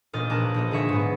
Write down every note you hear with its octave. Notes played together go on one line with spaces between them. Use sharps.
E1 A#2 D#4 D#5 F6 A6
A#1 A#4 A5 F#6 E7
A#1 D#4 D#5
D3 G#4 E5 C#6 G#6
G#2 B3